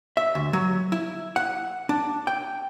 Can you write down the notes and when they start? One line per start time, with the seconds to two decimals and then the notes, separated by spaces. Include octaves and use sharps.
0.17 E5
0.35 D2
0.53 F#3
0.92 E4
1.36 F#5
1.89 D4
2.27 G5